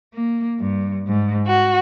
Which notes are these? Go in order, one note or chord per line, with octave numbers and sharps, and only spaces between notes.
A#3
G2
G#2
F#4